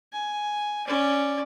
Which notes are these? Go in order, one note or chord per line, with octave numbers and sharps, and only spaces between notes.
G#5
C#4 D5